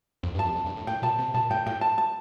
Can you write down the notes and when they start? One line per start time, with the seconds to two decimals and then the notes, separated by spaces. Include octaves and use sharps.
0.23 F2
0.35 G2
0.39 A5
0.45 F2
0.55 F2
0.66 G2
0.76 A2
0.87 A2 G5
1.02 A#2 A5
1.18 C3
1.34 A#2 A5
1.50 A2 G5
1.66 A2 G5
1.81 A5
1.98 A5